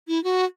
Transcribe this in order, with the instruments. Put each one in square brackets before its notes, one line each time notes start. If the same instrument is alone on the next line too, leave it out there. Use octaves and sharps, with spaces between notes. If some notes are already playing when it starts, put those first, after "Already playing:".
[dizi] E4
F#4